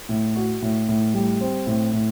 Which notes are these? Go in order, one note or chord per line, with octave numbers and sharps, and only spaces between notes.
A2
F#4
A2
A2
G3
C4
A2
A2